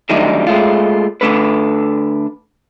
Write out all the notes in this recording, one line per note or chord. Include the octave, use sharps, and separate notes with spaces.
D3 D#3 F#3 G3 A3 D#4
G#3 A3 F4
D3 A3 A4 B4